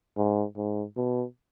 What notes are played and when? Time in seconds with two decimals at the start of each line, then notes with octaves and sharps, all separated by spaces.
0.17 G#2
0.57 G#2
0.97 B2